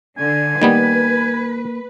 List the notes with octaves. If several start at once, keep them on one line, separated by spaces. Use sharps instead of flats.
D3 G#5
D#3 G3 A#3 B3 B4